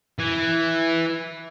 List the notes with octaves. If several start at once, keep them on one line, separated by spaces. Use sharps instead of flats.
E3